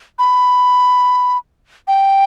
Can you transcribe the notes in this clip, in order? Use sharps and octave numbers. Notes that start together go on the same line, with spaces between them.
B5
G5